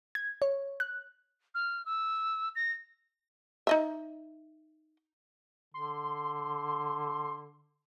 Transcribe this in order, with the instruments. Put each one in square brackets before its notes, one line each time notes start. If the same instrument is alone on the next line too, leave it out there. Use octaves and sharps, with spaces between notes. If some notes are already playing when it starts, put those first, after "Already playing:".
[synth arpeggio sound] G#6
C#5
F#6
[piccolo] F6
E6
A#6
[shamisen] D#4 D#5 E5
[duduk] D3 [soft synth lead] C6